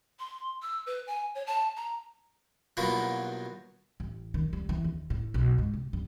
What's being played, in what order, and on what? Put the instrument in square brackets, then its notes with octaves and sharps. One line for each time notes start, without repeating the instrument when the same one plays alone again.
[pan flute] C6
E6
B4
G#5
C#5
A5
A#5
[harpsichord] G2 B2 F#3 A#3 E4 F4
[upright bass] A1
D#3
G3
E3
D#2
A2
B1
G#2
C3
G2